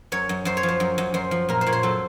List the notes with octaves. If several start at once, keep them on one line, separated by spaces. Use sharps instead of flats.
F#2 C#5
F#2
F#2 C5
C#5
F3
C5
F#2
F#2
F#2 C5
F3
A#2 A#4
C5
A#2 C#5
C5
F#3 A4